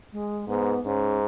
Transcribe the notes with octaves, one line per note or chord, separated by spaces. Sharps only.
G#3
G#2 B3
G#2 C#4